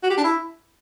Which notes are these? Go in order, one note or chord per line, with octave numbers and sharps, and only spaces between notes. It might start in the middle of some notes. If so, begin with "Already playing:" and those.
F#4
G4
D4
E4